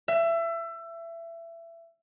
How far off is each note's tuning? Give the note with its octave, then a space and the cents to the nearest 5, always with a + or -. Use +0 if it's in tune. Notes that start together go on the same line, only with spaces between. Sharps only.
E5 +25